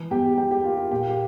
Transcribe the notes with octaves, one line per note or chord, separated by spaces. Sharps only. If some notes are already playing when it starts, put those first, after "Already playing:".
Already playing: E3
E2 G4
E2 G4
G4
A#3 F4
F4
A#2 G4
G4